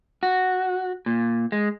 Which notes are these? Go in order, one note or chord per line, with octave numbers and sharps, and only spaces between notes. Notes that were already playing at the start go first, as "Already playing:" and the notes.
F#4
A#2
G#3